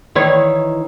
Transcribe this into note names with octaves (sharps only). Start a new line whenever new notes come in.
D#3 E3 C#5